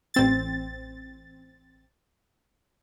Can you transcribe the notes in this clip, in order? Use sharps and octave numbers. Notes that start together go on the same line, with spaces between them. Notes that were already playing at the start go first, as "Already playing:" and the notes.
A1 C4 A6